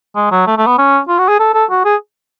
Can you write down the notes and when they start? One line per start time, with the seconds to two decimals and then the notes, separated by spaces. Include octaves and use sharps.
0.16 G#3
0.31 F#3
0.47 A3
0.57 A3
0.67 B3
0.78 C#4
1.08 F4
1.19 F#4
1.28 G#4
1.40 A4
1.54 A4
1.70 F#4
1.85 G#4